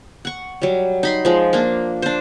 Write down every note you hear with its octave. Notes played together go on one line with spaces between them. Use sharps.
F#5 C#6
F#3 G3
D#4 B5 C6
F3 G#3
A#3 D4
D4 C5